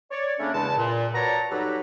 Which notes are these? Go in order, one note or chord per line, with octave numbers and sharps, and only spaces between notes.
C#5 D5
C#3 A3 A#3 C#4 D4
E2 C#3 G#3 A5
A#2
F#4 B4 C#5 D5 A5 A#5
F#3 G3 D#4 G4 A4 B4